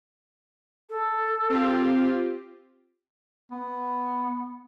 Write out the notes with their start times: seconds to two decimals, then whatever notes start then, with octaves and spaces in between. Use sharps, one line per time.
0.89 A4
1.50 C4 F4 G4
3.51 B3